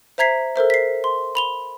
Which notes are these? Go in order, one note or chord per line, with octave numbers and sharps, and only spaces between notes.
C5 E5 A#5 G#6 B6 C7
A4 A#4 C5 E5
B6 C7
C6
B5 F7 G7